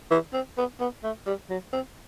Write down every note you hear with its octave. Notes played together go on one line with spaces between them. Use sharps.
E3
C4
B3
B3
A3
G3
F#3
C4